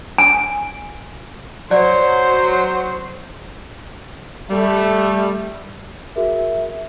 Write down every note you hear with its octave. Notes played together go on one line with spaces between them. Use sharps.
G#5
F#3 C5 D5
G3 A3
F#4 G#4 A#4 E5